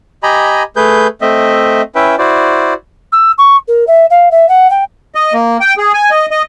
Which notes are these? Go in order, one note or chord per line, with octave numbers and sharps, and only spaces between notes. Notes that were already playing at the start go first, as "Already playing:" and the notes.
G4 D#5 G#5 A#5 B5
A3 G#4 B4 G6
A3 C4 D#5 E5
C#4 E4 B4 E5 G5
E4 F#4 C5 D5
E6
C#6
A#4
E5
F5
E5
F#5
G5
D#5
A#3
G5
G#4
G#5
D#5
D#5